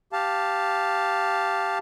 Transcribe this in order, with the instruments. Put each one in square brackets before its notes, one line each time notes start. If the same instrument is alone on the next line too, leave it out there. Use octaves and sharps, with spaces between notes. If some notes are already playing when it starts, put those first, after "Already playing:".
[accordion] G4 F5 A5